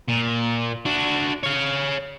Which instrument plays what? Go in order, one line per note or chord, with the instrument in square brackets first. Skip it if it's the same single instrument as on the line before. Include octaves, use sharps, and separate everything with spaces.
[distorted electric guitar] A#2
D4 F#4
C#5 F5